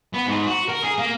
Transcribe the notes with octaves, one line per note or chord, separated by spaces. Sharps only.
B3
G#2
F#4
A#4
G#4
A#3